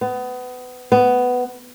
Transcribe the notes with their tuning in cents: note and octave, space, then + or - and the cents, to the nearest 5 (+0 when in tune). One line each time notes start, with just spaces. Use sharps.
B3 +25
B3 +10